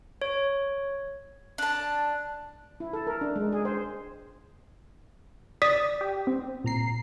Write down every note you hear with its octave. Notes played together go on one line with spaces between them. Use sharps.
C#5
D4 A5
E4
A4
A#4
D4
G#3
G#4
C5
D5 D#6 B6
G4
C4
A#2 A#5 C7